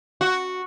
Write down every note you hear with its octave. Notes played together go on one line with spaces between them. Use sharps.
F#4